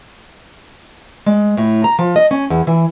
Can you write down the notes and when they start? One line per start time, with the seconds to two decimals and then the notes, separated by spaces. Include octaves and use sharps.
1.26 G#3
1.57 A2
1.84 A#5
1.99 F3
2.16 D#5
2.31 C#4
2.50 E2
2.67 E3